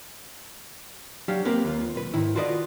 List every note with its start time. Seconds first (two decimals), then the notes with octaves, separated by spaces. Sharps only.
1.28 F#3 D4 G4 F5
1.45 A#3 C4 G4 A#4 B4
1.65 D#2 A#3 F4
1.96 B1 B4
2.14 G#2 D#3 E4
2.36 F4 F#4 A4 B4 D5 D#5